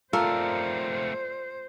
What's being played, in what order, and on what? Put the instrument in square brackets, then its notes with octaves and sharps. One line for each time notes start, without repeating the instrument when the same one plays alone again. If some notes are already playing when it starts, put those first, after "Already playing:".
[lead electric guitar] A3 C4 [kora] F4 A4 [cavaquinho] A#4 D5 [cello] C5